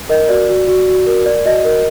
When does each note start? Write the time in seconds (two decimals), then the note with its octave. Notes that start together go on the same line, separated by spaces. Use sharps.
0.09 A#4 D#5
0.29 F#4 D5
0.48 F#4
0.68 F#4
0.88 F#4
1.07 A#4
1.26 D5
1.45 F#4 D#5
1.64 A#4